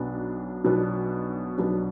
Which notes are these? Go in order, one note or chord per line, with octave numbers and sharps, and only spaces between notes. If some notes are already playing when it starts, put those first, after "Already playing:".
Already playing: B1 B2 F#3 B3 D4
B1 B2 F#3 B3 D4
B1 B2 F#3 B3 D4